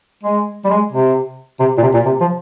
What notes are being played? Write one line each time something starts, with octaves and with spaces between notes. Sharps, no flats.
G#3
G3
G#3
C3
C3
A#2
C3
A#2
C3
F3